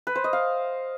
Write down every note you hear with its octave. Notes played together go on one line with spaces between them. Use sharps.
B4
C5
D#5
F5